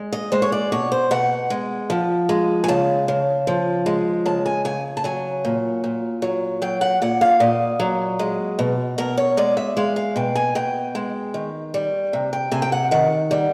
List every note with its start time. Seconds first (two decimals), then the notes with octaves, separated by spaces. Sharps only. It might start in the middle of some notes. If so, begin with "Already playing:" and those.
Already playing: G#3
0.12 D#5
0.32 G#3 C5
0.42 C#5
0.52 D5
0.72 B2 C#5
0.92 C5
1.11 B2 F#5
1.50 G#3
1.90 F3
2.29 G#3
2.64 G#5
2.68 C#3 A5
3.08 C#3
3.47 F3
3.86 G#3
4.26 C#3 A5
4.46 G#5
4.65 C#3 G#5
4.97 A5
5.04 F#3 G#5
5.45 A#2
5.84 A#2
6.22 F#3
6.62 F#3 G5
6.81 F#5
7.02 A#2 F#5
7.21 F5
7.40 A#2 D#5
7.80 F#3
8.19 G#3
8.59 B2
8.98 B2 A#4
9.17 C#5
9.37 G#3 D5
9.57 E5
9.77 G#3 F5
9.96 F5
10.16 B2 G5
10.35 G#5
10.55 B2 G5
10.95 G#3
11.34 D#3
11.74 G3
12.13 C3
12.33 G5
12.51 C3 G#5
12.62 G5
12.72 F#5
12.91 D#3 F#5
13.31 G3